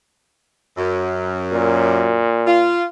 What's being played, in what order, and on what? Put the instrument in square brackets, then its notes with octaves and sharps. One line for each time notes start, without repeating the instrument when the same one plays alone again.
[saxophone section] F#2
[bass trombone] A#2
[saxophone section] F4